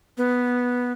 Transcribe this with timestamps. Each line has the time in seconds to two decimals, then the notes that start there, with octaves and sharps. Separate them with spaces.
0.18 B3